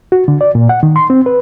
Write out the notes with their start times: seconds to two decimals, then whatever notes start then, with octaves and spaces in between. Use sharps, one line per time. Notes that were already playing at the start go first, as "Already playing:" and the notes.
0.12 F#4
0.28 D3
0.41 D5
0.55 A#2
0.69 F#5
0.83 D#3
0.96 C6
1.10 C4
1.26 B4